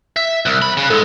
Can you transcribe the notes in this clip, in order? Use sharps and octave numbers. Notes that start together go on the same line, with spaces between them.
E5
C2 F#6
E2 B5
C#3
G#2 G#3 A4